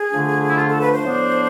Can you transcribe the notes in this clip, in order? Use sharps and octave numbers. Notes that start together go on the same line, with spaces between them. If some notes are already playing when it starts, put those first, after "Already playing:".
Already playing: G#4
D3 F3 A3 D4
E4
F4
A4
B4
C5
A2 F3 B3 D4